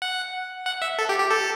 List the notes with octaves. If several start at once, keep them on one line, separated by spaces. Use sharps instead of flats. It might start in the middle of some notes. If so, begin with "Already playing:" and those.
F#5
F#5
E5
A4
G4
G4
A4